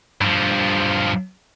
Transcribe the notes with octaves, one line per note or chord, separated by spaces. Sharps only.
G2 F3